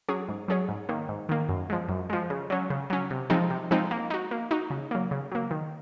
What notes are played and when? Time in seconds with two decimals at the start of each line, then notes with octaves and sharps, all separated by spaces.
0.09 F#3 C#4 G#4 C#5
0.29 G#2
0.48 F#3 C#4 G#4 C#5
0.69 G#2
0.89 D#3 A#3
1.09 G#2
1.29 D#3 A#3
1.49 F#2
1.70 F3 G#3
1.89 F#2
2.10 F3 G#3
2.30 C#3
2.50 F#3 C#4
2.70 C#3
2.90 F#3 C#4
3.11 C3
3.30 F3 G#3 C4 D#4
3.50 C3
3.71 F3 G#3 C4 D#4
3.91 A#3
4.10 D#4 F#4
4.31 A#3
4.51 D#4 F#4
4.70 C#3
4.91 F#3 A#3
5.11 C#3
5.32 F#3 A#3
5.51 D#3